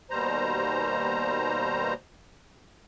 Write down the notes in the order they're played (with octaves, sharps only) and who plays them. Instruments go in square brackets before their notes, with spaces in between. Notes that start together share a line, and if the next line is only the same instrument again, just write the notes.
[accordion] D#2 B2 G3 C5 A#5